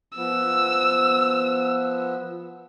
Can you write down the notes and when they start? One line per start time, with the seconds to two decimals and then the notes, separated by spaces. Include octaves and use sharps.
0.17 F3 B3 E6